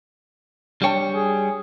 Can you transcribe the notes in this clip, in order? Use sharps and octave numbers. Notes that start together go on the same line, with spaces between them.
G3 D4 C#5 G5 A5
G#4